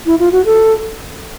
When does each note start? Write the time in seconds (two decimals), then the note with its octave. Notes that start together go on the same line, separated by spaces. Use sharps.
0.06 E4
0.20 F4
0.32 F#4
0.45 A4